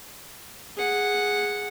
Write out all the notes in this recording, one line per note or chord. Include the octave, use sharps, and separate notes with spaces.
G#4 F#5